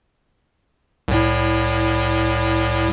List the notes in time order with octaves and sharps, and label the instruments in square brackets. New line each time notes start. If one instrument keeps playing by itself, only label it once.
[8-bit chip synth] C2 A2